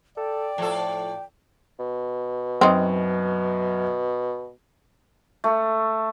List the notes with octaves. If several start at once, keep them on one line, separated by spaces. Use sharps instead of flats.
A4 D5 G5
A2 F3 A4
B2
F#2 C4 D#4
A3